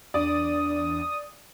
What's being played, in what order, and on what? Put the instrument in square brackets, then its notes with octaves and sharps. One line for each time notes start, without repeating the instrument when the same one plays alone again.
[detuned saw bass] E2 [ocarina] D4 [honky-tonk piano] D5 [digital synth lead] D#6